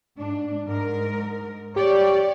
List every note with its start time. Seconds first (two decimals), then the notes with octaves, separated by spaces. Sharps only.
0.17 G#2 D4
0.67 G#2 A#4
1.76 G4 C#5 D5